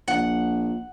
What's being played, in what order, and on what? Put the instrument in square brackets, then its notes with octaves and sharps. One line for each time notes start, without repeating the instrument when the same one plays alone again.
[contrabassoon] A#1 [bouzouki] F#5